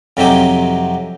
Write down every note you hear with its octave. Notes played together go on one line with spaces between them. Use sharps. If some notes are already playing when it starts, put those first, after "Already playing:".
F2 C3 F#3 D#4 G4 G#5